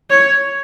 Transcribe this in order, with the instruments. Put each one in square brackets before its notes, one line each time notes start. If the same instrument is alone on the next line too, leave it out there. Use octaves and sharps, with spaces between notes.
[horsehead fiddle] C#5